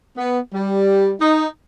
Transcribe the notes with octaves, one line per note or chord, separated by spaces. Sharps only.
B3
G3
D#4